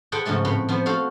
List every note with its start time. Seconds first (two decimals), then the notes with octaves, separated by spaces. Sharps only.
0.12 G#4 A4 B4 C5 F#5 G5
0.25 G#2 C#3 F3 A3 A4
0.45 A2 C4 B4
0.69 F3 B3 C5
0.86 F#4 A4 C5 F5